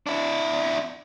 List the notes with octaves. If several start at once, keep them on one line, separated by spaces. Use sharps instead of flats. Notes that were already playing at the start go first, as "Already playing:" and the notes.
D4 E4